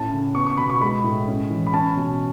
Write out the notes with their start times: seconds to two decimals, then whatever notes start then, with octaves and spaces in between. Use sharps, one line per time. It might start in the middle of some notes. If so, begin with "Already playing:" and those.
Already playing: A2 C#4 A5
0.12 C#3
0.35 B3 C#6
0.46 C#6
0.57 B2 B5
0.70 C#6
0.81 G#3 B5
1.04 A2
1.27 C#4
1.50 E3
1.67 B5
1.73 C#4 A5
1.96 B2